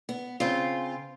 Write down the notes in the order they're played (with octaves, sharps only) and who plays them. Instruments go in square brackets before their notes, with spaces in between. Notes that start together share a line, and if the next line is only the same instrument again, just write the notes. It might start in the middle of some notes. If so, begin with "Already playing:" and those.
[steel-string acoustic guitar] B3
[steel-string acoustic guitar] C#3 C4 [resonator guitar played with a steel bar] F4